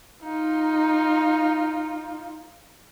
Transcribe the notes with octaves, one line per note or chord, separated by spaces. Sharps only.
D#4 F4